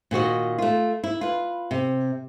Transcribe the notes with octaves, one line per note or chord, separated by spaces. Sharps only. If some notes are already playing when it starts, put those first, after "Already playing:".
A#2 D#3 F#4 D#5
A3 F4
E4
F4 B4
C3